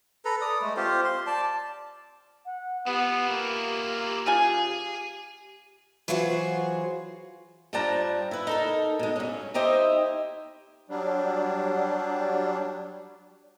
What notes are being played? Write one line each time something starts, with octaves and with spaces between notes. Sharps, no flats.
A4 B4 A#5
D5 D#6
G#3 A3
C4 F4 G4 C5
C6
D5 A5
F#5
B3 E4 F4 G4
A#3
C#3 F4 G#4 G#5
E3 F#3 F4 F#4 G#4 C5
G2 F3 G3 D4 A5 A#5
E4 B4
D#4 A4 A#4
B2 G#3
G2 C#4
D#4 E4 G4 C5 D#5 E5
F#3 G3 D4